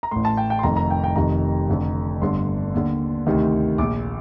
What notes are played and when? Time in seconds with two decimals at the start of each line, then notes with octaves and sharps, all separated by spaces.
0.03 A#5
0.11 A1 A2 C6
0.25 A5
0.37 G5
0.50 G5
0.59 C6
0.63 F1 F2 D#3 A#5
0.77 A#5
0.90 G5
1.04 G5
1.16 F1 F2 C3 D#3 A#5
1.69 F1 F2 D3
2.22 G1 G2 D3 C6
2.74 D#2 D3
3.27 D2 C3 D#3
3.78 A#1 A#2 D6